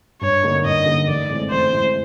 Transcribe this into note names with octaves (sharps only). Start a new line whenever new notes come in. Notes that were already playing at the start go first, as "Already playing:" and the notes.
G2 C#5
D3 G3 A#3 D#4
G2 D#5
D3 G3 A#3 D#4
A1 D5
A2 E3 G#3 C4
A1 C5
A2 E3 G#3 C4